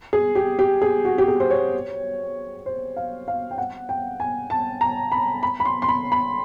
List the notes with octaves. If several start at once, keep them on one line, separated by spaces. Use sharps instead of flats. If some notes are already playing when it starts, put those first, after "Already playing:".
G#4
G4
G4
G#4
F#4
G4
G#4
C5
C#5
C5
F5
F5
G5
F#5
G5
G#5
A5
A#5
B5
B5
B5
C6
C6
B5
B5